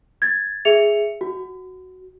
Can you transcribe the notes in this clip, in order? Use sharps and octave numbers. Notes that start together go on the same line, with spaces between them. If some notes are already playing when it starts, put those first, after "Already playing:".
G#6 A6
G#4 E5 C#7 F7
F#4